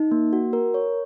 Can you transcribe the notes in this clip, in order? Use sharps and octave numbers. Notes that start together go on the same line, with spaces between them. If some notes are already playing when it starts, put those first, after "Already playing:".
Already playing: D#4
A#3
F#4
A#4
C#5